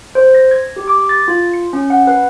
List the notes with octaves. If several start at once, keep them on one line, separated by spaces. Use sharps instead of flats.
C5
A#6
G#6
G4
D6
A6
F4
C#7
C#4
F#5
B4